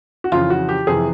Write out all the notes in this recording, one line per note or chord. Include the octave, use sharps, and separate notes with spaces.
F#4
F2 C#3 E3 F4
F#4
G4
F2 C3 E3 G#4